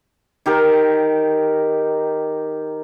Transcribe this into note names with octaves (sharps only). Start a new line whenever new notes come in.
D#3 G4 A#4